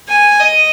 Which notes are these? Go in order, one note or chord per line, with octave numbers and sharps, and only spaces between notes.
G#5
D#5